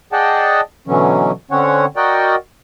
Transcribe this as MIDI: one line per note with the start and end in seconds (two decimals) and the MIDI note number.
0.12 0.61 68
0.12 0.61 74
0.12 0.61 75
0.12 0.61 78
0.12 0.61 79
0.12 0.61 81
0.88 1.31 47
0.88 1.31 50
0.88 1.31 52
0.88 1.31 54
0.88 1.31 61
1.51 1.85 50
1.51 1.85 60
1.51 1.85 61
1.51 1.85 73
1.51 1.85 78
1.96 2.35 66
1.96 2.35 70
1.96 2.35 74
1.96 2.35 75
1.96 2.35 78
1.96 2.35 79